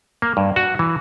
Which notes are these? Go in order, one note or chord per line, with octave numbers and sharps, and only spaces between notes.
A#3
G2
F#4
E3